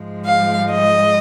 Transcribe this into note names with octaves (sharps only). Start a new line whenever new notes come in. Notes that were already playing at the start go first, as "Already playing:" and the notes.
Already playing: G#2 F3 G#3
F5
D#5